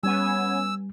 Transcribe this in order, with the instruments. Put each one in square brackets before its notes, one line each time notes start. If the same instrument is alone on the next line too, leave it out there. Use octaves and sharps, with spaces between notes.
[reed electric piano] G3 [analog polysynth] B3 C#4 G#5 [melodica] E6